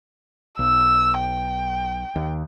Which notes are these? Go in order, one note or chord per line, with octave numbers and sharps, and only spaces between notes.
B1 E6
G5
D#2